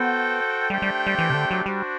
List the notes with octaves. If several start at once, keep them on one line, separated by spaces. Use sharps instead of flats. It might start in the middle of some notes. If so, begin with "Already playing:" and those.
Already playing: B3 F#4 A4 C5 G5
G3 A3 D4 G4 C5 G5
G3
G3
E3
C3
D3
F#3
G3 D4 F#4 C5